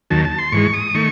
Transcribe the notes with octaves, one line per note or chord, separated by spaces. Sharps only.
D#2 D#3 F#3 A5
A5
C6
G#2 E3 G#3 C#6
D#6
D#3 A3 C#6